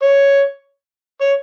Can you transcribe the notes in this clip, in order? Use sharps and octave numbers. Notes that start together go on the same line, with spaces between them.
C#5
C#5